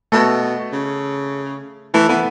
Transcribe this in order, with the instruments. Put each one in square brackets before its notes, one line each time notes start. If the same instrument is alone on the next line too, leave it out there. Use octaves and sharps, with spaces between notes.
[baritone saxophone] B2 [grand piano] A3 A4
[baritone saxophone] C#3
[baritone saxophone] E3 [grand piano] A3 A4
[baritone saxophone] E3 [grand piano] B3 B4